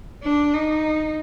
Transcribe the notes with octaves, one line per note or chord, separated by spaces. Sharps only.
D4
D#4